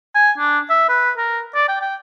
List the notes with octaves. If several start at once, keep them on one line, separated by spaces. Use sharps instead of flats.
G#5
D4
E5
B4
A#4
D5
G5
G5